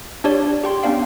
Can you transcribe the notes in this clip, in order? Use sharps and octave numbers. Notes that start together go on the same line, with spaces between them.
D4 G4 C#5 D5
G4 G5 C6
B3 C#4 D4 D5 F5 G5